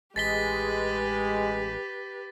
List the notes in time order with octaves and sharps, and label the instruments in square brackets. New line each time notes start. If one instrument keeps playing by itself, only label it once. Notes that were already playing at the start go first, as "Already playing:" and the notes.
[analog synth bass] A1 [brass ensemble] G#3 [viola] G4 B4 [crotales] A6 B6 G7